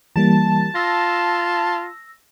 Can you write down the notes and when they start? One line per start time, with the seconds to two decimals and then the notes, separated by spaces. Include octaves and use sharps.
0.16 E3 G3 A#3 A5
0.75 F4 E6 A#6